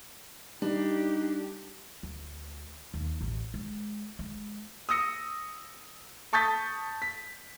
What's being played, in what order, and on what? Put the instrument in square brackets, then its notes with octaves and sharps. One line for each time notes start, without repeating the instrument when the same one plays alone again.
[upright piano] G3 [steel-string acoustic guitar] D4 [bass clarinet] D#4 [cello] G4
[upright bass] D2
D#2
A1
G#3
G#3
[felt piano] D#6 E6 A#6 C#7
A5 C#6 D#6 G6 A6 B6
B6